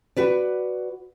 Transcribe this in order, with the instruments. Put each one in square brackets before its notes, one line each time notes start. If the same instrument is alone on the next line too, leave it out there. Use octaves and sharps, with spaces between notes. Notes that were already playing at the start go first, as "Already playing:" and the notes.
[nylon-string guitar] F#4 B4 D5